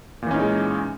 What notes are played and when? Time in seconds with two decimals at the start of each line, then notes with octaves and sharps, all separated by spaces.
0.22 A#2
0.27 E3
0.31 C#4
0.35 D#4
0.39 G#3